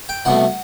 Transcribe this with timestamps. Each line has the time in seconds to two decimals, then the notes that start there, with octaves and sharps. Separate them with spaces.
0.09 G5
0.25 C2 B2 A3 F#5